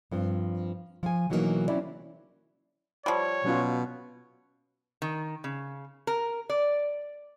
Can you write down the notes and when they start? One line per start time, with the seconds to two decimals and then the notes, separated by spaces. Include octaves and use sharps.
0.11 G2 F3 C4
1.03 F3 G#5
1.30 B2 E3 F#3 A3 A#3 D#4
1.68 F#3 C4 C#4 E4 D5
3.06 F3 G3 C#5
3.44 B2 F#3 C#4 F4
5.02 D#3
5.44 C#3
6.07 A#4
6.50 D5